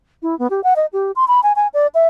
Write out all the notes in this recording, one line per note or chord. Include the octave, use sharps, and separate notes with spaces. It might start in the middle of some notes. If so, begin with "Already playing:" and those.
E4
B3
G4
F#5
D#5
G4
C6
B5
G#5
G#5
D5
E5